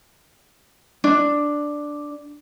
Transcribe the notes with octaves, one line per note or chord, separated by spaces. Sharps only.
D4